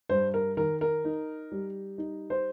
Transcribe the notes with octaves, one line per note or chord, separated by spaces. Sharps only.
G2 C5
A#4
D#3 A#4
A#4
D#4
G3
D#4
C5